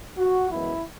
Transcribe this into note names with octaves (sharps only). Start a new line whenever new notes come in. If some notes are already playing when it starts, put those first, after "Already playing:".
F#4
F#2 E3 G#3 B3 E4